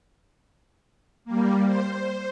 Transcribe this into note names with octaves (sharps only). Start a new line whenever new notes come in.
G3 A#3
C5